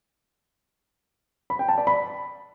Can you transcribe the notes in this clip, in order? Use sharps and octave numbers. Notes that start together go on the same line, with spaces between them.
B5
G5
A5
D5
B5